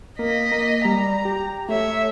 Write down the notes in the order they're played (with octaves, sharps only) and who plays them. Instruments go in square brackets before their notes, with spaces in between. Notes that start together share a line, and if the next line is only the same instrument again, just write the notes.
[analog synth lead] A#3 [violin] D#5 B6
[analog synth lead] A#3
[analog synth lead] G3 [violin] A#5
[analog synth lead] G4
[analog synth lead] A3 [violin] C#5 E5